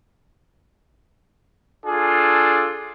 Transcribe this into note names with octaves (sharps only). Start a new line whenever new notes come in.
D4 F4 G#4 A4